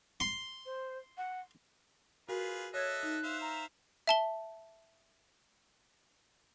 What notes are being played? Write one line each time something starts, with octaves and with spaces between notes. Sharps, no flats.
C6
C5
F#5
F4 F#4 G#4 A#4 B4
A4 C#5 D#5 E5 F#6 G#6
D#4
C5 E5 F5
A#5
E5 A5 G7